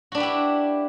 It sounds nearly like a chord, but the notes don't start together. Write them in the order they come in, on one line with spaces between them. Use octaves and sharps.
F#4 D4 B4 G4 E4